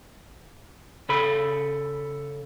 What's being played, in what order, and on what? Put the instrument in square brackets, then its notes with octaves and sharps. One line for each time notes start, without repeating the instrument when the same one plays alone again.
[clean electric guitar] C#3 A4 B5